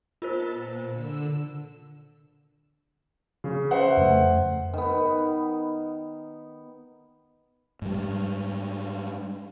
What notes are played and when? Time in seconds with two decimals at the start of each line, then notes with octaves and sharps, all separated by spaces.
0.22 B3 F4 A#4 C5 A5
0.53 A#2
0.91 D3 E6
3.44 C#3
3.71 B4 C5 E5 F#5
3.97 F2 C#3 A3
4.73 D#3 B3
7.82 G#2 G3